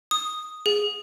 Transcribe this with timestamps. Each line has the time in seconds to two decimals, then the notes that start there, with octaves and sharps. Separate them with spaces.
0.11 D#6
0.66 G#4